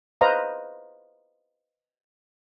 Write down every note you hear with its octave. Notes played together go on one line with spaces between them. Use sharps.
B4 C5 D#5 F5 A#5 D#6